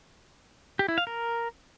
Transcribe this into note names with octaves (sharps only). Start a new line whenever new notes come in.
G4
E4
F5
A#4